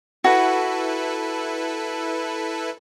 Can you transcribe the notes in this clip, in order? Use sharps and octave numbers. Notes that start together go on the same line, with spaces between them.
E4 F#4 A4 B4